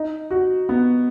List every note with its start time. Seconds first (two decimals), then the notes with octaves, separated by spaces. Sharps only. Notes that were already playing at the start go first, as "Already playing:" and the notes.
Already playing: D#4
0.31 F#4
0.69 B3